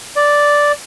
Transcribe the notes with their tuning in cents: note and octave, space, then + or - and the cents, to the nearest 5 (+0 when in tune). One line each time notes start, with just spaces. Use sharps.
D5 -5